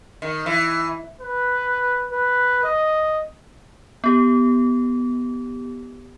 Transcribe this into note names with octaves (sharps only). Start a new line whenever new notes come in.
D#3
E3
B4
B4
D#5
B3 G4